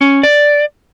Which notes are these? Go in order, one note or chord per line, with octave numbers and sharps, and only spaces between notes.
C#4
D5